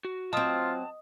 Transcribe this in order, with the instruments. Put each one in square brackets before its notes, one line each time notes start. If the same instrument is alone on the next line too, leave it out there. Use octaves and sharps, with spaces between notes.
[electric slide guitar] F#4
[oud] F#3 C4 [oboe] F4 [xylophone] D#5 D#6 [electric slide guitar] A5